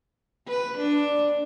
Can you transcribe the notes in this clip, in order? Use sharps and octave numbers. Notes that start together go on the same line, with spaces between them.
B4
D4